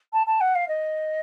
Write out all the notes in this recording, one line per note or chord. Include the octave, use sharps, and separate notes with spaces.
A5
A5
F#5
F5
D#5